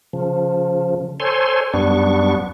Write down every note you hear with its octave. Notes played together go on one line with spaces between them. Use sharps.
C#3 F3
A4 C5 C#5 G#5 C6
F#2 G3 B3 D4 C#6